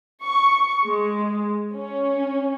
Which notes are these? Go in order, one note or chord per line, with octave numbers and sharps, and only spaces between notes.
C#6
G#3
C#4